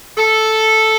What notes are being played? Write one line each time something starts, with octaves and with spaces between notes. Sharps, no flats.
A4